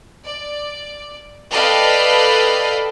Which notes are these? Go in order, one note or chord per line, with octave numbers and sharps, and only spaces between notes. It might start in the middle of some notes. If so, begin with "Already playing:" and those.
D5
A4 B4 D5 D#5 F5 G5